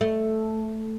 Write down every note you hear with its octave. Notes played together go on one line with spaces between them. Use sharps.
A3